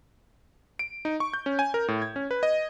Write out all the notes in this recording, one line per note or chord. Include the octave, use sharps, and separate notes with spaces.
D7
D#4
C#6
G6
C#4
G#5
A#4
A2
G#6
C#4
B4
D#5